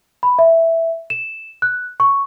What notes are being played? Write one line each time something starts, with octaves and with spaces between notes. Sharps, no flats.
B5
E5
E7
F#6
C#6